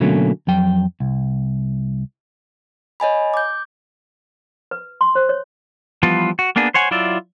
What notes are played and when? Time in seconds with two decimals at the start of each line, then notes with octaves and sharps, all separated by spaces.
0.01 B2 D3 F#3 A3 A#3 C#4
0.47 F2 F#3 G5
1.00 C2
3.00 C#5 D#5 G#5 B5
3.34 D6 G6
4.71 B4
5.01 C6
5.15 C5
5.29 C#5
6.03 E3 F3 G3 B3 F4
6.39 F#4
6.56 A#3 B3 D4 G#4
6.74 C5 C#5 F#5 G#5
6.91 F#3 E4 F4 D5 E5